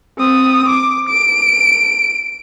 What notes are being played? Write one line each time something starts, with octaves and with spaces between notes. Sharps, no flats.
C4 D#6
D6
D7